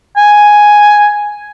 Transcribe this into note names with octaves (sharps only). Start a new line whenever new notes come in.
G#5